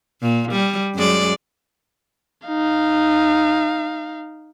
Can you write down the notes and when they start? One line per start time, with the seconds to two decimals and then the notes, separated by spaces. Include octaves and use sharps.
0.22 A#2
0.52 G3
0.95 F#2 G#3 D5
2.48 D#4 F5